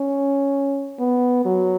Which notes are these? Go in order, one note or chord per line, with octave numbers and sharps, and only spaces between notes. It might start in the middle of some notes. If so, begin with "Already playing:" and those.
Already playing: C#4
B3
F#3